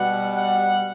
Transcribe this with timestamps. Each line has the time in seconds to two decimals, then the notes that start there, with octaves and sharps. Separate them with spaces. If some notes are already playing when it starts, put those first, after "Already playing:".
Already playing: B2 G3 F#5
0.33 F#5